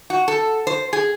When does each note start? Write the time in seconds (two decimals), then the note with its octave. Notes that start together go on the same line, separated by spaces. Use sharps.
0.10 F#4
0.28 A4
0.67 C5
0.93 G#4